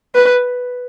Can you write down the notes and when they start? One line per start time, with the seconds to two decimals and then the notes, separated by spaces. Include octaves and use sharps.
0.15 B4